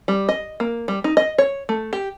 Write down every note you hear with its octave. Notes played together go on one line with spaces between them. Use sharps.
G3
D#5
A#3
G3
D#4
D#5
C#5
A3
G4